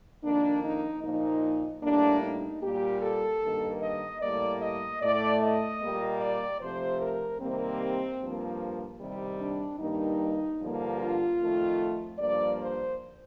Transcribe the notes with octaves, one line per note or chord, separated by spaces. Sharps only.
F2 D#3 A#3 D4
D#4
A#2 F3 A#3 D#4
A2 G3 A#3 D4
D#4
A#2 G3 A#3 G4
A4
G2 D#3 A#3
D#5
A2 G3 A#3 D5
D#5
A2 A3 D5
D#5
A#2 G3 A#3
D5
C3 F3 A3 C5
A#4
C3 D#3 G3 A#3 C4
G2 F3 A#3
C3 D#3 G3
D4
G2 D#3 G3 A#3 D#4
G2 D3 F3 A#3
F4
F2 D#3 A3
G2 F3 A#3 D5
C5